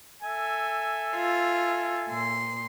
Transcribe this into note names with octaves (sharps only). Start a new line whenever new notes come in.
A4 E5 G#5
F4
A#2 C6